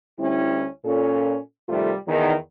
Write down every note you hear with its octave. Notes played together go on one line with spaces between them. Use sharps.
D2 G3 C#4 E4
A#2 C#4 A4
F2 C3 D#3 G3 A3 F4
E2 D#3